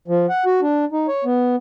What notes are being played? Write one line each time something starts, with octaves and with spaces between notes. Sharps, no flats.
F3
F#5
F#4
D4
D#4
C#5
B3